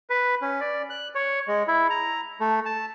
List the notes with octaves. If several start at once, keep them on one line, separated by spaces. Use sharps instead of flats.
B4
C#4
D5
F#6
C#5
G#3
E4
A#5
A3
A5